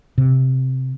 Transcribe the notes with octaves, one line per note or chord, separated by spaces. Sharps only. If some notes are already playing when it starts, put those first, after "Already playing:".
C3